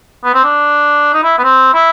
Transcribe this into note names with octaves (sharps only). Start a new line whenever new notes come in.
B3
C4
D4
D#4
E4
B3
C4
E4